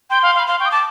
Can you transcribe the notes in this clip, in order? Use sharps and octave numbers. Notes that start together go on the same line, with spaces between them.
G5 C6
F5
F5
B5
F5 C6
G5 C#6
D#6
A5 D6